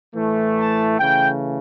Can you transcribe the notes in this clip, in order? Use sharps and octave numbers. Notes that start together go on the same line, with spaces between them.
A2 E3 A3
A5
C#3 E3 A3 G5